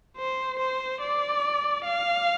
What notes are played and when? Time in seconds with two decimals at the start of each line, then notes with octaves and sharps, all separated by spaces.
0.18 C5
0.59 C5
1.01 D5
1.85 F5